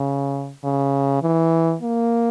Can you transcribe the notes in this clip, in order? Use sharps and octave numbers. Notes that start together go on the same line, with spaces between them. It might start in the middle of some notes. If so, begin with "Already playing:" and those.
Already playing: C#3
C#3
E3
A#3